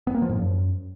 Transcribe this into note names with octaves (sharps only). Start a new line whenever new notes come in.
B3
A#3
F3
G#2
F#2